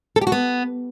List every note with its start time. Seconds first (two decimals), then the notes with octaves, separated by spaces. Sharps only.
0.16 A4
0.21 G4
0.27 F#4
0.32 B3